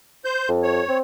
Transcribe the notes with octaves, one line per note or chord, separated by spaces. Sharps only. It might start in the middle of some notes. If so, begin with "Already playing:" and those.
C5 G6
F2
C#5
C4